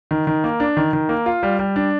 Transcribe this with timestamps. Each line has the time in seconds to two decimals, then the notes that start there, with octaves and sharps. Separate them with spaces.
0.11 D#3
0.27 D#3
0.44 A#3
0.60 D4
0.77 D#3
0.93 D#3
1.09 A#3
1.26 F4
1.43 G3
1.59 G3
1.76 D4